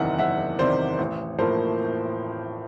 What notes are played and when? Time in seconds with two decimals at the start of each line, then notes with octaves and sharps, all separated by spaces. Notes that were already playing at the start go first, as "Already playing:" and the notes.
Already playing: F#1 E2 C3 D#3 E5 F#5
0.18 F#1 E5 F#5
0.59 E2 C3 D#3 C5 D5
0.99 A1
1.39 A2 F3 A#3 A#4 C5